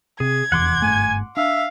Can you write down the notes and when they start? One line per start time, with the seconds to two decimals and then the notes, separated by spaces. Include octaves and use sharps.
0.20 C3 G#4 G#6
0.52 F1 E2 F#5 C6 D6
0.82 G1 G#2 A3 G#5
1.37 D4 E5 F5